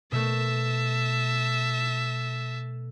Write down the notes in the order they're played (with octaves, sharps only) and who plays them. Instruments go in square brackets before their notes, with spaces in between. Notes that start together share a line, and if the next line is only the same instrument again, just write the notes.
[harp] B2 A3 [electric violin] E5 A5